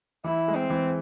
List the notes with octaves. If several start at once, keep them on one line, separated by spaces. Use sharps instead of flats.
E3 E4
G#3
C4
E3